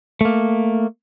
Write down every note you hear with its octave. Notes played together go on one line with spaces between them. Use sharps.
A3 A#3